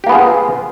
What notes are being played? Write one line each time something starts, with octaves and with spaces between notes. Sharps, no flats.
A#3 B3 F4 G4 G#4